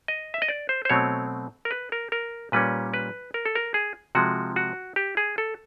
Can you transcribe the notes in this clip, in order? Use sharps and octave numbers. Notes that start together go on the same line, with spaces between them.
D#5
E5
D#5
D5
C5
C5
B2 F#3 A3 C4 C#5
A#4
B4
A#4
A#4
A#2 G3 A#3 C#4 B4
B4
A#4
A4
A#4
G#4
C3 F3 G#3 F#4
F#4
G4
G#4
A4